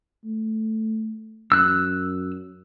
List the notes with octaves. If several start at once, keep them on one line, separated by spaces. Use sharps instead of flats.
A3
F#2 E6 F#6